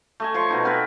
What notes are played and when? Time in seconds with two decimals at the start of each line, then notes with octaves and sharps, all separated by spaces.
0.20 A3 D#5 G#5
0.34 F3 C#5 C6 C#6
0.49 B2 D#4 D#5
0.64 B3 C4 A#4 B4